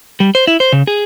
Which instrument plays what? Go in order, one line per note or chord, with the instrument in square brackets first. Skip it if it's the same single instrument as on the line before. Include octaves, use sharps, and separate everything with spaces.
[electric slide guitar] G3
C5
E4
C5
C#3
G#4